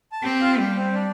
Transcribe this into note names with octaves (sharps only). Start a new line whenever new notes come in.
A5
C4 G4 G5
F4 F5
G3 G4 G5
C4 C5
D4 D5